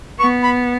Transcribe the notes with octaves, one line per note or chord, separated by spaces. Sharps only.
B3 C#6
B5